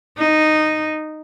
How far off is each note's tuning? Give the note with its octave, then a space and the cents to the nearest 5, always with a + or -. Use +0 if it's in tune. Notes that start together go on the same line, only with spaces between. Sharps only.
D#4 -10